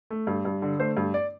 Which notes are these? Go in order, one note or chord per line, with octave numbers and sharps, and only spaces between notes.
A3
G2
G2
D3
A3 C5
G2
D5